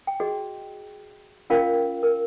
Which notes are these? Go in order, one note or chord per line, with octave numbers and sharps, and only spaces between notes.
G5
F#4 G#4 D5 D#5
C#4 F4 A#4 D5 F5 G5
A#4